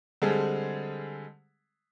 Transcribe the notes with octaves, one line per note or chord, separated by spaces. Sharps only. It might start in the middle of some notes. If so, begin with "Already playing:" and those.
D3 G3 G#3 C4 G#4 A4